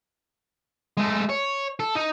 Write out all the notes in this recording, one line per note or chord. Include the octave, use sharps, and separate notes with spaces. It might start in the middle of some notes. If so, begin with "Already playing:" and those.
G#3 A3
C#5
A4
D#4